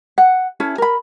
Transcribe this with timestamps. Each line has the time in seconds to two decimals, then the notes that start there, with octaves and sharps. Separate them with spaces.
0.18 F#5
0.60 C#4 E4 A4
0.78 A#4 B5